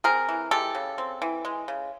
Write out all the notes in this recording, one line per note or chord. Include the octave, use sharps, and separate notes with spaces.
C4 G#4 A#4
E3
G#3 G4 A4
C#3
C4
E3
G#3
C#3